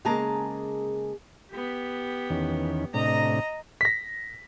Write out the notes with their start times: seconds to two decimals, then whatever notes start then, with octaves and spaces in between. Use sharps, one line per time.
0.05 C#3 G#3 A#3 G#4 A5 A#5
1.51 B3 G4
2.30 E2 D#3 C#4
2.94 A2 C3 D4 D#5 A#5
3.81 A#6 B6